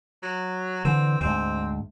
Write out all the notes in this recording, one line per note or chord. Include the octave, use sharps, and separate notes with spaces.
F#3
D3 E3 C4
D2 G#2 C4